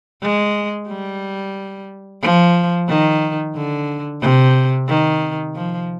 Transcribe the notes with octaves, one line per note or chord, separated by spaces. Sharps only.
G#3
G3
F3
D#3
D3
C3
D#3
F3